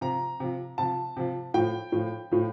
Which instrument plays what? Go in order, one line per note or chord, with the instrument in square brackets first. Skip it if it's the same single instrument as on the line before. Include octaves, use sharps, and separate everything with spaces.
[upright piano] C3 F3 A#5
C3 F3
C3 F3 A5
C3 F3
A2 F3 G5
A2 F3
A2 F3